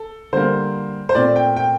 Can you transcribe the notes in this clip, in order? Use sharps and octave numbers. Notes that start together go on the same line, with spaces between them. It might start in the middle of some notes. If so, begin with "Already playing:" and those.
Already playing: A4
D3 G3 A#3 C5
C5
A#2 A3 C4 D5
G5
G5